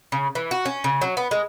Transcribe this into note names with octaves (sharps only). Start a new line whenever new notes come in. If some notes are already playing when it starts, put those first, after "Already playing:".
C#3
E3
F#4
C#4
C#3
F#3
B3
G#3